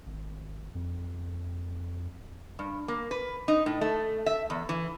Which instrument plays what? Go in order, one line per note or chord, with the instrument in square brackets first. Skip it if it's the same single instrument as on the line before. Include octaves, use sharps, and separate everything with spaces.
[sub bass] G#1
F2
[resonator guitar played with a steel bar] G2
A#3
B4
D#4
A2
A3
E5
E2
E3